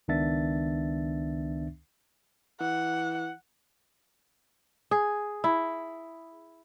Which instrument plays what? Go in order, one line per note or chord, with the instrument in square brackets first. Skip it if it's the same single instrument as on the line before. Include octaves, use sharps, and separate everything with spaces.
[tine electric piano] C#2 D#3 B3 D4 E5 A6
[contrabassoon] E3 [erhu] F#5
[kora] G#4
E4